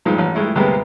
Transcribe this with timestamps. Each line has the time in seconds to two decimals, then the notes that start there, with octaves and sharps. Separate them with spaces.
0.05 G2 A#2 F3 G#3 D#4
0.18 A1
0.35 G2 G#3 A3 E4
0.55 D2 G2 C3 G#3 A#3 B3